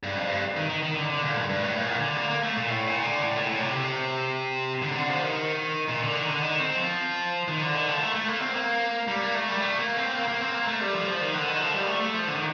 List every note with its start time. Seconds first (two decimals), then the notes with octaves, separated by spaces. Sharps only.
0.03 G2
0.16 F2
0.30 G2
0.57 D#3
0.70 D#3
0.83 D#3
0.96 D3
1.10 D3
1.23 A#2
1.36 G2
1.49 G2
1.63 A2
1.81 A#2
1.99 D3
2.16 A#3
2.30 A#3
2.43 A3
2.56 A#2
2.69 A2
2.87 A#2
3.05 D3
3.22 A2
3.36 A#2
3.49 A2
3.62 C3
3.76 C3
4.83 D3
4.91 C3
4.95 D3
5.09 F3
5.22 D#3
5.89 A#2
6.02 D3
6.15 D#3
6.29 D3
6.42 D#3
6.60 C4
6.77 F3
7.48 D#3
7.61 D3
7.75 D#3
7.88 F3
8.02 A3
8.15 A3
8.28 A#3
8.42 C4
8.55 A#3
9.08 G3
9.21 A#3
9.34 A3
9.48 G3
9.61 A3
9.79 A#3
9.97 C4
10.15 A#3
10.28 A#3
10.41 C4
10.54 A#3
10.68 A3
10.81 G3
10.94 F3
11.02 G3
11.07 F3
11.21 D#3
11.34 D3
11.48 D#3
11.61 F3
11.74 G3
11.87 A3
12.01 A3
12.14 F3
12.27 D3
12.35 D#3